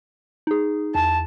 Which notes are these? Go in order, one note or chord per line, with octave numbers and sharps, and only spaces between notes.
D#4 G#4
E2 A5